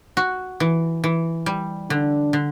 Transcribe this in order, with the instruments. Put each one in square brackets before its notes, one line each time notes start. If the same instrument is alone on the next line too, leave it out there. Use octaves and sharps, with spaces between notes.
[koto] F#4
E3
E3
G3
[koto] D3 [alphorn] D4
[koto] D3